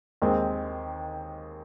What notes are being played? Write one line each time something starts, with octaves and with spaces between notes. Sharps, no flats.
D#2 D#3 G#3 C4